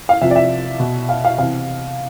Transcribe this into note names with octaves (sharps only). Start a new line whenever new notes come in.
F5
C3 F3 E5
D5
E5
B2
F5
F5
C3 E3 F5